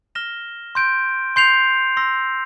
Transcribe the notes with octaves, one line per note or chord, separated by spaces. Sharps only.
F6 A#6 E7 G7
C6 G6 D7
C6 G6 C7 F7
C6 E6 A#6